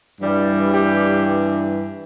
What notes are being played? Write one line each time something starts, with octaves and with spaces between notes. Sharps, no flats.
G2 E3 G3
G3 G4